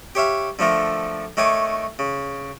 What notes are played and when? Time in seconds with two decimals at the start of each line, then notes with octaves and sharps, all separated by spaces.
0.15 G4 C#5 E5 F5
0.59 D3 F3 A3 A#4
1.37 D#3 A3 C#5 G#5 D6
1.99 C#3